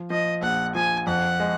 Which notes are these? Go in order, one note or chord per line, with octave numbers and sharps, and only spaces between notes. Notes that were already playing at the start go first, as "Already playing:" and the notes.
Already playing: F3
F3 D#5
A#1 F#5
F3 G#5
F2 F#5
G#3